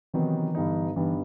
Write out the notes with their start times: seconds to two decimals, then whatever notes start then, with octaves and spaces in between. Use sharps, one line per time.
0.14 C3 D#3 E3 F#3 B3 D#4
0.55 G2 D3 G3 B3 D#4
0.96 G2 D3 E3 G3 B3 D#4